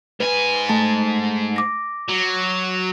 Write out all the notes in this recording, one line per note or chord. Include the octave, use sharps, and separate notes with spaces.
G#2 B4 G#5
A3 A5 A6
D6 A#6
F#3